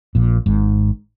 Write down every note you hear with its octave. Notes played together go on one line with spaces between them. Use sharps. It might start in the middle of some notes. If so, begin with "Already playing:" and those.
A#1 A#2
G#1 G#2